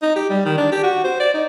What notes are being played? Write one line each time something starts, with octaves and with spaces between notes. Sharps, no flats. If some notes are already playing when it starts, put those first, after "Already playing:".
D#4
G4
G3
D#3
D4
G4
F#4
C5
D5
D#4